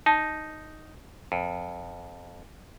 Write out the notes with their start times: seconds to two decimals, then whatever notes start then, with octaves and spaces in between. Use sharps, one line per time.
0.06 D#4 A5
1.32 F2